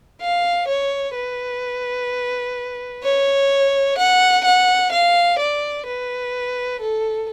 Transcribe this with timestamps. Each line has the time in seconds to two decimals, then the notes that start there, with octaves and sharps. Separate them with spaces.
0.21 F5
0.68 C#5
1.15 B4
3.03 C#5
3.98 F#5
4.45 F#5
4.92 F5
5.39 D5
5.86 B4
6.80 A4